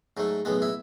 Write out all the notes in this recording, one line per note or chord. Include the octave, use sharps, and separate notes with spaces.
G#2 F#3 A3
B1 A2 G#3 B3
E4